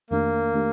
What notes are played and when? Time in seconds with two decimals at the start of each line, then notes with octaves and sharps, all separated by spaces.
0.10 F2 D#3 A3 A#3 D4 G4
0.54 D#3 A3 D4 G4